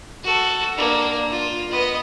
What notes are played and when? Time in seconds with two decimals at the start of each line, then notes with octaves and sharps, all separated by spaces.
0.24 F#4 A4
0.75 A#3 D4
1.30 F4
1.71 B3 D#5